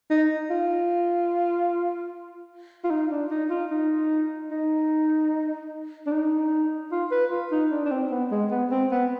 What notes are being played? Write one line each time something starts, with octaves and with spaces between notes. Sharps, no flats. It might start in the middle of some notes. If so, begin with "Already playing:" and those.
D#4
F4
F4
D#4
D4
D#4
F4
D#4
D#4
D4
D#4
F4
B4
F4
D#4
D4
D4
C4
B3
G#3
B3
C4
B3